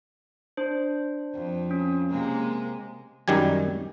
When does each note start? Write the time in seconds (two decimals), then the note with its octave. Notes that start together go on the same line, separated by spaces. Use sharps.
0.57 D4 C5
1.35 F2
1.71 C#4
2.10 C3 G#3 A#3
3.28 F#2 D#3 G3 G4 G#5